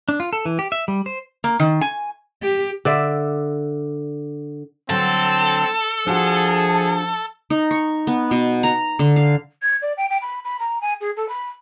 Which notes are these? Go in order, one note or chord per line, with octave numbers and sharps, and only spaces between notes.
D4
F4
A4
E3
G4
E5
G3
C5
A#3
D#3
G#5
G4
D3 D5 E5
D3 F#3 C4 A4
F3 D4 F4 F#4 G#4
D#4
C#6
B3
B2
A#5
D3
F5
G#6
D5
G5
G5
B5
B5
A#5
G#5
G#4
A4
B5